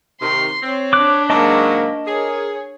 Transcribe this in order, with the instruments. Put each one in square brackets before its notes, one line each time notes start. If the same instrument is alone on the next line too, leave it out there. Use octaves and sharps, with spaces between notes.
[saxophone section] C3 D#3 [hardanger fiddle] C6
[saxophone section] C4 [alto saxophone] C#5
[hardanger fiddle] D4 B5 [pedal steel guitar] D6 F#6
[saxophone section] G#2 C#3 F#3 [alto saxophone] A#3 [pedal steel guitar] D#5 A5 D6
[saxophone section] G#4 [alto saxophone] A#4 [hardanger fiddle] C#5